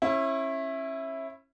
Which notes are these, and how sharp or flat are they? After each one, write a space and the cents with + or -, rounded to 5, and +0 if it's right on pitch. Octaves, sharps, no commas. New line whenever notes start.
C#4 -35 E4 +0